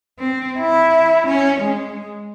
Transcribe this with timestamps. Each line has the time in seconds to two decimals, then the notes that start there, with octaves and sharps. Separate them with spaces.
0.19 C4
0.59 E4
1.27 C#4
1.60 G#3